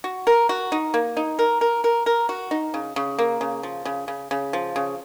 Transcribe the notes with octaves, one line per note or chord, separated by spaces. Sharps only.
F#4
A#4
F#4
D#4
A#3
D#4
A#4
A#4
A#4
A#4
F#4
D#4
C#3
C#3
A#3
C#3
F3
C#3
C#3
C#3
F3
C#3